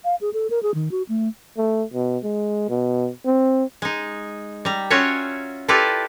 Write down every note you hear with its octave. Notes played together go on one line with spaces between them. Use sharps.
F5
G#4
A4
A#4
G#4
D#3
F#4
A3
A3
B2
G#3
B2
C4
G#3 D#4
G3 A#5
C#4 F4 F#4 C#5 E5
E4 F4 G4 A4 B4 D5